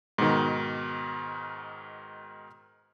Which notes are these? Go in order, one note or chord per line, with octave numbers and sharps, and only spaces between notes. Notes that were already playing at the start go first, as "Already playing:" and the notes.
G#2 B2 D#3